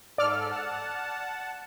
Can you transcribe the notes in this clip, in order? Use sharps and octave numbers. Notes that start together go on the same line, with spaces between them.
G#2 A4 D5 F6
F#5 A5